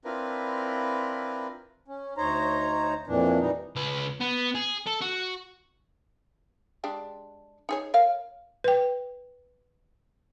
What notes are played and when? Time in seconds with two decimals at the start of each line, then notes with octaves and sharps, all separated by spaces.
0.04 C4 D4 E4 F4 A#4 B4
1.88 C#4
2.17 D2 D#4 C5 C#5 A#5
3.07 F2 A#2 E3 D4
3.40 E3 G3 D#4
3.76 C#2 B4
4.20 B3
4.55 G#4
4.87 A4
5.02 F#4
6.84 G#3 D4 G4
7.69 D#4 G#4 C#5
7.94 A#4 C#5 F5
8.64 B4 G5